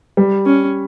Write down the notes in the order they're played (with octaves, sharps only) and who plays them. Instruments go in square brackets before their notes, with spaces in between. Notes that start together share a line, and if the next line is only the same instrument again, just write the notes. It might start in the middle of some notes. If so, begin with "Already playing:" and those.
[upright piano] G3
[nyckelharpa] C#4